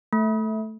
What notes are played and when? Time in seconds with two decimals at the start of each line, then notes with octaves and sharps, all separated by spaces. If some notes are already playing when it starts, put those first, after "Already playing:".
0.13 A3